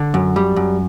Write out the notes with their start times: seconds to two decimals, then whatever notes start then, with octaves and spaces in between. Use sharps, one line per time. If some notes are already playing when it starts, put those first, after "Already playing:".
Already playing: D3
0.14 F#2
0.36 G3
0.56 F#2